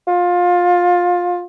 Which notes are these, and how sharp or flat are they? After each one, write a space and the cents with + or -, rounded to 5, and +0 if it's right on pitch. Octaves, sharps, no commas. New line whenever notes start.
F4 +20